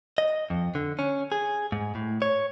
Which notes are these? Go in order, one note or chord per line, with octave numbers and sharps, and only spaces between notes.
D#5
F2
D3
C#4
G#4
G#2
A2
C#5